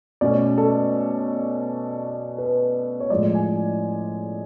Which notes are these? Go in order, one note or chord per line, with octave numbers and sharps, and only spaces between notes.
B2 A3 C#4 D5
A4
B4
C#5
A2 F3 G#3 D5
G#5